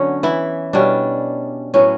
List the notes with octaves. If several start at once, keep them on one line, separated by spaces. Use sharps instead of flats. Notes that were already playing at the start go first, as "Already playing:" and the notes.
Already playing: D3 F#3 B3 C#4 C#5
E3 E4
B2 G3 C#4 D4
A2 F#3 B3 C#4